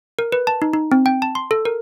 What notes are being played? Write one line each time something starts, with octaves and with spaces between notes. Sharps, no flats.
A#4
B4
A5
D#4
D#4
C4
G5
A5
C6
A4
A#4